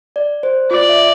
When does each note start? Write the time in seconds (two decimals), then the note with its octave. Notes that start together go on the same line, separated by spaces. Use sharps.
0.16 D5
0.43 C5
0.70 F4 D5
0.89 E5